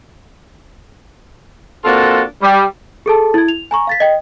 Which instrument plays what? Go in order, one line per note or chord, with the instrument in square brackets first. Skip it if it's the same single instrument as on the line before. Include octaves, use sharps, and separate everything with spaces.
[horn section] A#3 C4 D4 F4 F#4 A4
G3
[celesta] G#4 A4 A5
E4 G#6
F7
G#5 A#5 C#6
F5 A6 B6
D#5 G5